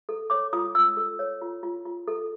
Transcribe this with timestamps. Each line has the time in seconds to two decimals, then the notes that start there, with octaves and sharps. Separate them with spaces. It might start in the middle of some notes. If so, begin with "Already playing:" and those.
0.09 A4
0.30 C#5 D6
0.53 F4 D#6
0.75 F4 E6
0.97 A4
1.19 C#5
1.42 F4
1.63 F4
1.85 F4
2.08 A4